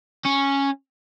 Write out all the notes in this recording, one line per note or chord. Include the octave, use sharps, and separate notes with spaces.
C#4